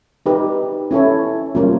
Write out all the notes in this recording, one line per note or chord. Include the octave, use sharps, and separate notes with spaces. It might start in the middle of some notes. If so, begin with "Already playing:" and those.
D#4 G4 B4
C#4 E4 A4 C#5
G3 A#3 C#4 F4